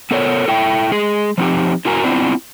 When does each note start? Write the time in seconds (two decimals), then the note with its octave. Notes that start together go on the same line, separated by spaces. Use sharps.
0.11 B3 A4 A#4 C#5
0.48 E4 A4 E5 G5
0.92 G#3 G#4
1.38 F3 C4 D#4 G4
1.85 E4 F#4 A#4 G#5 A#5
2.04 B3 C4 D4 E4 F4